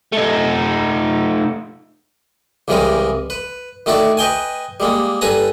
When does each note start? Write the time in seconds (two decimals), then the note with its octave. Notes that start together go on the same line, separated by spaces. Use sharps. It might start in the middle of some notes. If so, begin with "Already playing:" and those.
0.13 A3 D#4
2.68 C2 C#3 E3 G3 G#3 A#4
3.30 B4
3.86 D#3 A3 E4 F#4 A4 D5
4.17 B4 D#5 G5 G#5
4.80 G3 G#3 A#3
5.21 G2 A4 B4 G#5 A#5